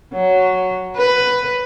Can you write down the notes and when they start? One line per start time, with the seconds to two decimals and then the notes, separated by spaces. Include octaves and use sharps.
0.13 F#3
0.97 B4